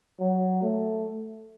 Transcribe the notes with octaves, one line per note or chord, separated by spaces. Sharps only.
F#3
A3